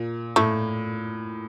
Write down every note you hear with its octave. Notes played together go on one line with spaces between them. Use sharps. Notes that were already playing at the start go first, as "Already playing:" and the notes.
Already playing: A#2
A2 A3